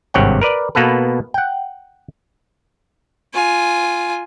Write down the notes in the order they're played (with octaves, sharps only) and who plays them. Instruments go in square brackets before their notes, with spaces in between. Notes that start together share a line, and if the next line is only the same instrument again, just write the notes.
[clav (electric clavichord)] G#1 G2 C3 C#5 F#5 G5
A#4 B4 D5
B2 A#3 B3 A4 B4
F#5 G5
[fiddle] F4 G#5